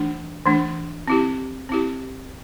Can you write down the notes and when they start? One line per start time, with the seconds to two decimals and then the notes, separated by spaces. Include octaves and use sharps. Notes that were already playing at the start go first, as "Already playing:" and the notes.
Already playing: E3 A3 D4
0.46 E3 A3 D4
1.07 C4 E4 G4
1.69 C4 E4 G4